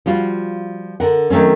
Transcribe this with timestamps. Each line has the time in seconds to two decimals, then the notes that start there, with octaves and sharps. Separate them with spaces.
0.06 F3 G3 F4 F#4
1.00 D3 A#4 F#5
1.30 D#3 F#3 A3 C4 C#4